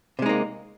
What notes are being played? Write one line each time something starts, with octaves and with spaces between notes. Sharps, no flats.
C3 G#3 A#3 D#4